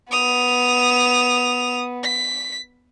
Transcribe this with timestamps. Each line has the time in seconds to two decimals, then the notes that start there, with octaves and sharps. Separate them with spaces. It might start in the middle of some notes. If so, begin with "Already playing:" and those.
0.11 B3 D#6 F7
2.03 B6